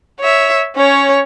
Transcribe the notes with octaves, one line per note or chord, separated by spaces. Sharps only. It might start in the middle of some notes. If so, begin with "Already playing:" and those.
C#5 E5
C#4 C#5